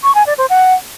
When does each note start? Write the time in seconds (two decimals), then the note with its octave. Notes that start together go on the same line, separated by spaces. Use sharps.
0.03 C#6
0.15 G#5
0.26 D5
0.38 C5
0.50 F#5